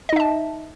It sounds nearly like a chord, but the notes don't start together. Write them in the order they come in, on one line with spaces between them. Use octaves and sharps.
D#5 D#4 E5 A5